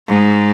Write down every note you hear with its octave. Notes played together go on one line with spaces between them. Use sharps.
G#2